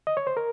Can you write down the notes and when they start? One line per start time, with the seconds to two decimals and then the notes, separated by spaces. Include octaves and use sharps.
0.07 D#5
0.17 C#5
0.27 C5
0.37 A#4